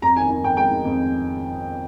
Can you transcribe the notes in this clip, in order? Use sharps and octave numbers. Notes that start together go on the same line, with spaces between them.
F2 A#5
D#3 G#5
D#3 G#5
F2 G5
G#3 G5
D#3
F2